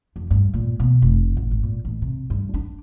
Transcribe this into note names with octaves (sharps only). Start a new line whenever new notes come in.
F2
G2
A#2
B2
F1
A1
G#1
A#2
A1
C3
G2
D4